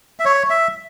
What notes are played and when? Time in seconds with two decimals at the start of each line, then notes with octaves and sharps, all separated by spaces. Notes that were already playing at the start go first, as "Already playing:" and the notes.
0.20 E5
0.25 C#5
0.50 E5